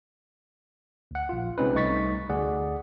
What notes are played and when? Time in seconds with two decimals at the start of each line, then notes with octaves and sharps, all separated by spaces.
1.11 D2 F#5
1.29 A#1 F4
1.58 C3 G#3 C4 C#4 D#4 B4
1.74 C2 A3 D#4 C#6 A6 B6
2.29 D2 G#4 D5 F#5